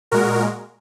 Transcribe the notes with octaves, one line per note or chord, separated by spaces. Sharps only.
A#2 G#3 F#4 A#4